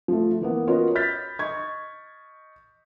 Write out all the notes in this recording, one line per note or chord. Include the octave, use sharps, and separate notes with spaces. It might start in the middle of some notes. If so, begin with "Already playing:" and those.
F3 A3
E3 A#3 B3
C#4 F4 F#4 A#4 B4 D#5
B5 F6 G6 A6 B6
D#5 C#6 G#6